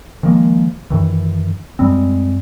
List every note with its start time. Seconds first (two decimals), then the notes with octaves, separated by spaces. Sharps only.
0.23 D#3 F3 G#3 A#3
0.90 F#2 D#3 E3
1.79 F#2 G3 G#3 C4